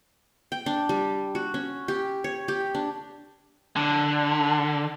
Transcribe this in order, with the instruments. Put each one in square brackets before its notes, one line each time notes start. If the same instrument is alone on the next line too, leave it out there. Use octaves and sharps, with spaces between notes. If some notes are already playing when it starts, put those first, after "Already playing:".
[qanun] G5
D4
G3
F#4
C#4
G4
C#5
G4
D4
[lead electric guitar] D3